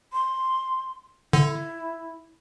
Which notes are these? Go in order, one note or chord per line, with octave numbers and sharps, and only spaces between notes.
C6
D3 E4